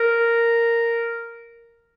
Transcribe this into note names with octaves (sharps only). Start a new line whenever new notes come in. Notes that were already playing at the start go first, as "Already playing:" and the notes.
Already playing: A#4